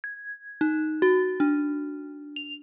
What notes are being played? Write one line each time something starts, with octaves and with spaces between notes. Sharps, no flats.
G#6
D#4
F#4
D4
F7